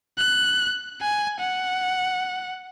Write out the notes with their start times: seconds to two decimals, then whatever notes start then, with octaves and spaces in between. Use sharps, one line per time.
0.18 F#6
1.01 G#5
1.40 F#5